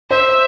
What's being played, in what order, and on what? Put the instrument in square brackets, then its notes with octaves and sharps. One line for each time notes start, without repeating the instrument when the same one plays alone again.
[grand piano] C5 [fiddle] E5